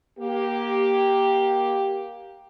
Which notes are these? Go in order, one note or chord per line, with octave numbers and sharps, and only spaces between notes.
A#3 G4